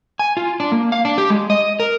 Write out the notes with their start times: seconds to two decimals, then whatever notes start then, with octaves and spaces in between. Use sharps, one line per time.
0.19 G#5
0.37 F4
0.60 D4
0.72 A#3
0.92 F5
1.05 D4
1.18 G4
1.30 G#3
1.50 D#5
1.80 A#4